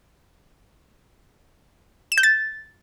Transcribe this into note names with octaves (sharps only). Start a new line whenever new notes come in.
E7
G6
A6